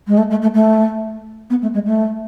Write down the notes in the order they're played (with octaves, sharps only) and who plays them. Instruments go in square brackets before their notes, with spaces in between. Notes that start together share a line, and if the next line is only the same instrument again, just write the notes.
[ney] G#3
A3
A3
A3
A3
B3
A3
G#3
A3